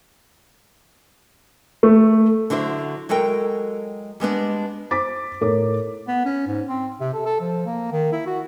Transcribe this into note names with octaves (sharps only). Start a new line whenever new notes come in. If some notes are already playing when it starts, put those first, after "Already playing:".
A3
D3 F#3 D4 E4 C5
F#3 G#3 A4 A#4 G5
G3 G#3 B3 D4
C5 D6 A6 B6
A2 A#4 C#5 D6
B3
C#4
G#2
C4
C3
A4
A4
F3
A#3
D#3
E4
F#4